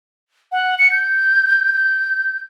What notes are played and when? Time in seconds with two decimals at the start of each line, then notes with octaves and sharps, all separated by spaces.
0.52 F#5
0.79 C#7
0.92 G6
1.73 G6